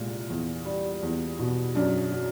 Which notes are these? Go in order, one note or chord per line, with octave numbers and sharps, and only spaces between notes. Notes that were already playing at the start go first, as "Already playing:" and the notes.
Already playing: C2 A#2 G#3
E2
G3
E2
B2
F#2 D4
F#3